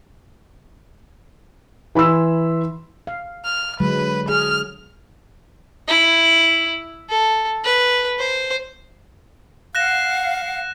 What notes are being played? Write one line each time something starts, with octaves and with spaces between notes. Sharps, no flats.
E3 B5 C6 E6 E7
F5
F6
D3 F#3 G#3 B4
G#4 F6
E4
A4
B4
C5
F5 F#5 F#6 A#6 E7